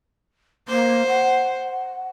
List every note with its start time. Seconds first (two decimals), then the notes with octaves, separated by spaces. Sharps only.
0.68 A#3 C5
1.07 F#5